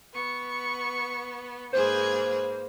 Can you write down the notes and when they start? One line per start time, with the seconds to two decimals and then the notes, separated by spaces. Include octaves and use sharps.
0.13 B3 C#6
1.73 G#2 A#3 G#4 B4 C5